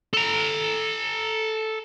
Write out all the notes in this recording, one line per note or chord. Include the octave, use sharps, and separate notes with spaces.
A4 A#5